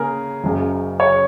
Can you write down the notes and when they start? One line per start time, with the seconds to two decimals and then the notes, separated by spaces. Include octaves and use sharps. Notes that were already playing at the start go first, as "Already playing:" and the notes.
Already playing: C#3 A#3 G#4 A#4
0.43 F#1 F#2 C#3
1.00 C#5